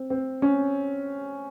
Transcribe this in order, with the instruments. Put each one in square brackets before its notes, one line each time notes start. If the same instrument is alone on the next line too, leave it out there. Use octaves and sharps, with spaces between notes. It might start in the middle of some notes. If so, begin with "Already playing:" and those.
Already playing: [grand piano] C4
C4
C#4